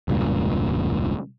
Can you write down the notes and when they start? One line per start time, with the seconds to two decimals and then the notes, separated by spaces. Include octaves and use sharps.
0.08 E1 C#2 G2 A#2